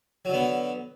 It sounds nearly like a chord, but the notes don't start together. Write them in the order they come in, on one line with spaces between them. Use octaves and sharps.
F#3 D3 B3